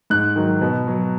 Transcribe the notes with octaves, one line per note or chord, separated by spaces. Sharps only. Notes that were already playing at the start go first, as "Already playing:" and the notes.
G#2 F#6
D#3 F#3
B2
F#3